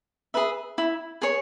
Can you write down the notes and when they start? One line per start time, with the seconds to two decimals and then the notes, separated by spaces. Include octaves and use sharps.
0.34 G#4 B4 E5
0.78 E4
1.22 G#4 C#5 G#5